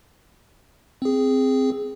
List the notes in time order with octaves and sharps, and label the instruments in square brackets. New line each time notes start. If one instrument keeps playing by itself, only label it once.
[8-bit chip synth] C4 G#4